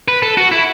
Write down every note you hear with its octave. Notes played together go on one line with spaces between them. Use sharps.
B4
A4
F#4
E4